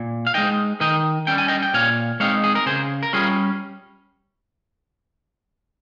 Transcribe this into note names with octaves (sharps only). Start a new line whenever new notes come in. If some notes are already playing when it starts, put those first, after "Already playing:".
Already playing: A#2
F5
G#3 D#4 D#5 G5
D#3 D#5 G5
G3 C#4 G5
G#5
D#5 G5
G5
A#2 C#5 F5
G#3 C4 D#4 C#5 F5
G#4
A#4
C#3 G#4 C5
A#4
G3 C#4 F4 G#4